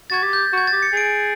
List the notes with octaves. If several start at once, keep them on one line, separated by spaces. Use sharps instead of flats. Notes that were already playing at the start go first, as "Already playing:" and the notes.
F#4 G#6 A6
G4
G6
F#4 G#6
A6
G4
C#7
G#4 D7